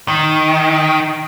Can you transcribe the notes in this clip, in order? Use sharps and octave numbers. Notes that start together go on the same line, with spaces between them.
D#3